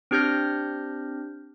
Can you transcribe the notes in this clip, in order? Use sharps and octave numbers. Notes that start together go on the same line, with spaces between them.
C4 D4 G4 F6 G6 A#6